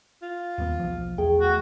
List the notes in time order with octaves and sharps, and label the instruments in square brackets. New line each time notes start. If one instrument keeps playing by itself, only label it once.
[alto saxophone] F4
[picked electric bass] D#2 G3 B3
B1 F3
[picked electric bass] E2 [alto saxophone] A3 [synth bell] G#4 G5
[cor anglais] F#4